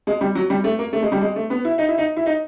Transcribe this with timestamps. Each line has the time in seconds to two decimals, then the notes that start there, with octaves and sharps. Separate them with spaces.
0.07 G#3
0.21 G3
0.35 F#3
0.50 G3
0.64 A3
0.79 A#3
0.93 A3
1.03 G#3
1.12 G3
1.21 G#3
1.36 A3
1.50 B3
1.65 E4
1.78 D#4
1.88 E4
1.98 D#4
2.16 E4
2.26 D#4